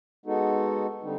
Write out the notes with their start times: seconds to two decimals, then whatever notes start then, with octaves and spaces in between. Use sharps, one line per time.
0.26 G#3 B3 D#4 F#4 A4
1.02 D3 G3 C4 D#4